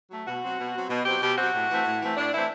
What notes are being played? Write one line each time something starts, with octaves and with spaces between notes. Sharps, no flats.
F#3 A3
B2 F#4
F#3 C4
B2
F#3 C4
B2
F#3 C4 G4
B2 G4
F#3 C4 F#4
A2
E3 A3 C4
A2
E3 A3 C4
A2 D4
E3 A3 C4 E4